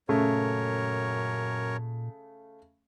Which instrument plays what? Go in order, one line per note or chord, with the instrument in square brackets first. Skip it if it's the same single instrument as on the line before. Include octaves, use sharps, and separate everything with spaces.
[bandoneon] F#2 A#4 C#5 [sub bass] A#2 [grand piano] C#3 A3